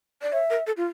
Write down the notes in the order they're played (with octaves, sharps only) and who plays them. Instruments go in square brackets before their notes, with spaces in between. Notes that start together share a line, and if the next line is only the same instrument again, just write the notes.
[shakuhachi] D5
[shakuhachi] C#5 [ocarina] E5
[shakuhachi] A#4
A4
F4